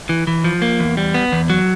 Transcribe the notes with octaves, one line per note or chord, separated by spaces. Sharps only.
E3
E3
F3
A#3
E2
G3
B3
E2
F#3